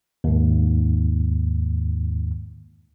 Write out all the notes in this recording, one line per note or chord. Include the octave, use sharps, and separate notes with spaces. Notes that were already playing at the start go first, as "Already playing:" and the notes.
D#2 G#2